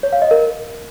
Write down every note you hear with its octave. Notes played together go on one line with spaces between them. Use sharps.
C#5
F5
D#5
A#4